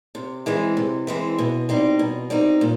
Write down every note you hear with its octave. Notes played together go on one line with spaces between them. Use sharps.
C3
E3 G#3 C4
C3
E3 G#3 C4
B2
G3 C4 D#4
B2
G3 C4 D#4
A#2